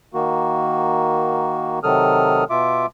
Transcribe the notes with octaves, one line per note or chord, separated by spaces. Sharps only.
D#3 A#3 F#4
C3 D#3 F#3 A4 D#6 F6
B2 F4 E5 D6